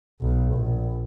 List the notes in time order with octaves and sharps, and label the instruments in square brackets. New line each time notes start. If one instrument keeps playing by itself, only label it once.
[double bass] B1
A#1